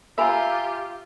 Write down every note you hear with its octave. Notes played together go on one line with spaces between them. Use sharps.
F4 G4 E5 G#5 A#5 B5 E6